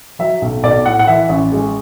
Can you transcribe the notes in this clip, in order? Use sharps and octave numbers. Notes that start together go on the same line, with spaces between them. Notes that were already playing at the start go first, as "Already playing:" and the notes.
F#3 E5
B1
B1 D5
A2 F#5
F#5
E3 E5
A1
G#3